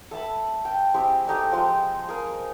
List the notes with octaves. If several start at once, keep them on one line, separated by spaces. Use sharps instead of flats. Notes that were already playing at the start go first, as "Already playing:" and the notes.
A4 E5 A5 B5
G5
C4 E4 G4 G#4
A3 D#4 G4 A4
F3 G#3 G5
G#4 A#4